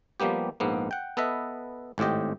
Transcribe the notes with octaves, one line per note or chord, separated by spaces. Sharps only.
F3 G3 A#3 B3 G4
A#1 G#2 A#3 B3
F#5 G5
B3 A4 B4 D#5 E5
G#1 A2 C4 G4 D#5